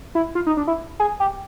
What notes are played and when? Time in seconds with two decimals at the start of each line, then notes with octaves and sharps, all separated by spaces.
0.15 E4
0.35 F4
0.46 D#4
0.57 D4
0.67 E4
1.00 G#4
1.20 G4